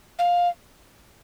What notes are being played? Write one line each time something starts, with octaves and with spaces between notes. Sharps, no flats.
F5